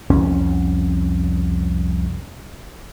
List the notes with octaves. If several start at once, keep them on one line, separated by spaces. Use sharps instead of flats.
C2 F2 C#4